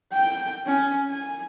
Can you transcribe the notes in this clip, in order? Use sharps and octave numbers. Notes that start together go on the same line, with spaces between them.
G5
C#4
G#5